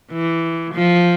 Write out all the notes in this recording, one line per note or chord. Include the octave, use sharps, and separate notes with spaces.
E3
F3